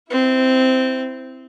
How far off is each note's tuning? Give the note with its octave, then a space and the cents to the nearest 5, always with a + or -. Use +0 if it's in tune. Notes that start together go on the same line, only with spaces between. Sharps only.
C4 -10 E4 +0